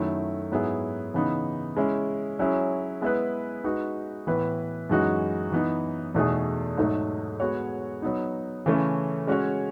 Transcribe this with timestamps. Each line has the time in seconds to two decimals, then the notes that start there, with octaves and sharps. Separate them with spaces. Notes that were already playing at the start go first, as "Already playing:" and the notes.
Already playing: F#2 D#3 F#3 A3 E4
0.52 G#2 F#3 B3 E4 G#4
1.14 C#3 E3 B3 D#4
1.77 G#3 C#4 E4
2.39 F#3 C#4 E4 G#4
3.02 G#3 B3 E4 G#4 B4
3.64 G#3 D#4 F#4 B4
4.27 A2 E3 B3 E4 B4
4.90 F#2 E3 G#3 D#4 F#4
5.52 E3 B3 D#4
6.14 E2 B2 A3 D#4 G#4
6.77 G#2 F#3 A3 D#4
7.40 G#3 B3 F#4 C#5
8.02 F#3 B3 D#4
8.66 C#3 E3 A3 C#4
9.27 G#3 C#4 F#4 C#5